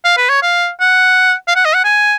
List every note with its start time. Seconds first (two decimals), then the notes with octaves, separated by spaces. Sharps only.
0.04 F5
0.17 B4
0.29 C#5
0.42 F5
0.80 F#5
1.48 F5
1.55 F#5
1.65 D#5
1.74 F#5
1.84 G#5